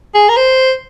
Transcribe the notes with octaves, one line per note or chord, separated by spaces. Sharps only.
G#4
A#4
C5